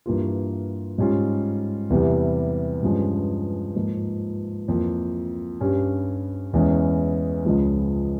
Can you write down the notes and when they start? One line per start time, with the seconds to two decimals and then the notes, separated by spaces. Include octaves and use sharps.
0.06 G2 E3 A#3 F4
0.98 G#2 G3 C#4 F4
1.90 E2 C3 E3 G3
2.83 G2 F3 G#3 C#4
3.76 G#2 F3 A#3 F4
4.68 F2 E3 A#3 F4
5.61 G2 G3 C#4 G4
6.53 E2 E3 G#3 C#4
7.45 C#2 C#3 F3 G#3